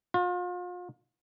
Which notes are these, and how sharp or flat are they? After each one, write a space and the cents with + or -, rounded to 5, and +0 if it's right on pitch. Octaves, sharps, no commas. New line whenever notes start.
F4 +35